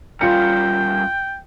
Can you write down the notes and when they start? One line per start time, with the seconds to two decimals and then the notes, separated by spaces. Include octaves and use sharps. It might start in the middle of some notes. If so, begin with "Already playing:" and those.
0.21 G3 C#4 F4 A#4 G5 C#7